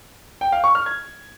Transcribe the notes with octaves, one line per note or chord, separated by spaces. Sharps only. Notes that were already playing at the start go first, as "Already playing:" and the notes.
G5
F5
C#6
F6
G#6